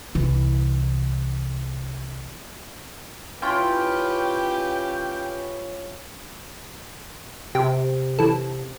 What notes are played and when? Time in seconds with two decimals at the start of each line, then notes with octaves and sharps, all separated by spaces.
0.15 C2 E3
3.42 C#4 E4 F4 G4 B4 G5
7.55 C3 G4
8.19 E3 A4